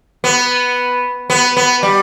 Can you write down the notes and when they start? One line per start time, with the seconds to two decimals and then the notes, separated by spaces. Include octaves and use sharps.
0.24 B3
1.30 B3
1.57 B3
1.83 G3